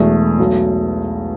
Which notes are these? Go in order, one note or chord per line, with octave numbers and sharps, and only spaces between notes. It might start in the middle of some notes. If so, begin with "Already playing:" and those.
Already playing: E1 E2 B2 A3
B1 B2 F#3 A3